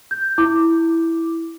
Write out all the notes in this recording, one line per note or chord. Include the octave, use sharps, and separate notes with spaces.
G6
E4 D6